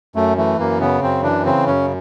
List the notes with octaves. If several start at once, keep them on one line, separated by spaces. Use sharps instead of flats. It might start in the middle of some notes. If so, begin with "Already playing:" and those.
F#2 A3
E3 A3
F#2 A#3
C#3 B3
F#2 C4
E3 D4
C#3 C4
F#2 C#4